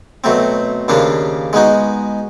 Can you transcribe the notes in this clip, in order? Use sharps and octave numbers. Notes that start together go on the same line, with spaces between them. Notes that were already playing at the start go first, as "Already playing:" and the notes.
B2 F#3 A3 C4
D#2 C#3 F3 A#3 D4
G#3 B3 D#4 F#4